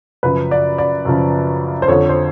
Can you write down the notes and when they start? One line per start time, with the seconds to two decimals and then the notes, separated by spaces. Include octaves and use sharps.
0.23 F#2 C#3 F3 B4
0.51 D5
0.78 D5
1.05 F#2 C#3 F3
1.82 C5
1.88 F2 D3 F3 C#5
2.09 C5